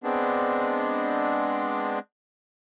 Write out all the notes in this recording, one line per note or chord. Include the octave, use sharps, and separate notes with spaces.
G#3 B3 C4 D4